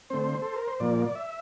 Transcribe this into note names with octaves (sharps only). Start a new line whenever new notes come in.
D3 A3 C4 C5
A4
A#4
C5
A#2 F3 A#3 D5
D5
E5